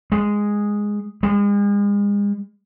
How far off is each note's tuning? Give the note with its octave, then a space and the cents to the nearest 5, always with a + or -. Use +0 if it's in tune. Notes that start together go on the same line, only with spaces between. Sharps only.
G#3 -5
G#3 -40